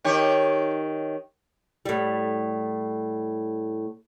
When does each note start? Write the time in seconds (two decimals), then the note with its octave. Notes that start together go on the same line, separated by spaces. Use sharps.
0.04 D#3 G4 C#5
1.85 A2 G3